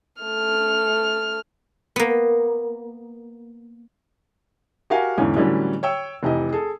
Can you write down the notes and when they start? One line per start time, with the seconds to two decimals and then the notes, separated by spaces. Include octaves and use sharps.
0.22 A3 F6
1.96 A#3 B3
4.90 F#4 G4 A#4 F5 F#5 G#5
5.18 E2 G#2 D3 E3 C#4
5.36 A2 D3 E3 F#3 G3 C#4
5.83 C#5 G5 E6
6.23 F1 E3 G4 D#5
6.53 G#4 A4